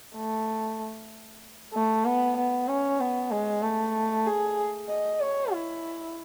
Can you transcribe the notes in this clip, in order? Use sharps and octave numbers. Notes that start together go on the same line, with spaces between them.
A3
A3
B3
B3
C#4
B3
G#3
A3
G#4
D#5
C#5
E4